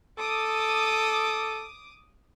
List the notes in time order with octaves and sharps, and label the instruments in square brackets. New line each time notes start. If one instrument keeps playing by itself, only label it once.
[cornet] A4 [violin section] D6 D#6